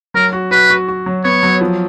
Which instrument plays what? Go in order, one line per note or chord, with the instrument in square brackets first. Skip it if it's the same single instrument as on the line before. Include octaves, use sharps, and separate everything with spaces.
[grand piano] F#3 [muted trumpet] A#4
[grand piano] F#4
[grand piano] F#4 [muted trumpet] B4
[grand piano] F#4
F#4
F#3
[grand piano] B3 [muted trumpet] C#5
[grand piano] F#3
F3